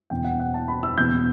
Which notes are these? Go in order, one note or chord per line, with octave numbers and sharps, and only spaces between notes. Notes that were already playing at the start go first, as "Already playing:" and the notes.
E2 B2 G5
F#5
F#5
A5
B5
E6
E2 B2 G6